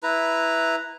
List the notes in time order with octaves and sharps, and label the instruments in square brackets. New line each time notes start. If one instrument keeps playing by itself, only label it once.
[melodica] E4 B4 A#5